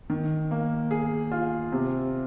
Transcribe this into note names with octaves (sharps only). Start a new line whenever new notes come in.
D#3
A#3
G#4
F4
C3